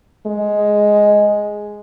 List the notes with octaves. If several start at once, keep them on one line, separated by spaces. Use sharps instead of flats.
G#3